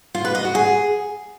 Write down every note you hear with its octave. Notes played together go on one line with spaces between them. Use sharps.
F4
B4
D#5
F#4
G#4